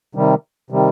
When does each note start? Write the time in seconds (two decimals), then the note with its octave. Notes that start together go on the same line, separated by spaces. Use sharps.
0.15 C3 D#3 G3
0.70 C3 D#3 G3